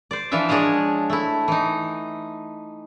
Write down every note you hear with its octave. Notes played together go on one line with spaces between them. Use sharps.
C5 D5
E3 F3 D4 F4 E5
G#3 D4 C#5 D#5 F5
A3 E4
E3 D#4